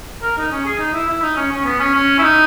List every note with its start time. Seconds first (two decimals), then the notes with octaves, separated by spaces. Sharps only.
0.23 A#4
0.37 D#4
0.52 C#4
0.65 G#4
0.79 D#4
0.93 E4
1.08 E4
1.22 D#4
1.37 C#4
1.52 C#4
1.65 B3
1.79 C#4
1.94 C#4
2.18 E4
2.23 D#4